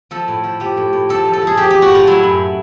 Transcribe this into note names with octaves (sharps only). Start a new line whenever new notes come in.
F3 A4
A2
F3
F3 G4
A2
A2
F3 A4
F3
A4
F3
G#4
F3 G4
F3 G4
F#4
A2 F4
F#3 E4
F#2